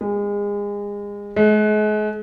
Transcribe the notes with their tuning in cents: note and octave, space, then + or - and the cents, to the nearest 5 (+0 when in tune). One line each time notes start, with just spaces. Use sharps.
G#3 -30
G#3 +40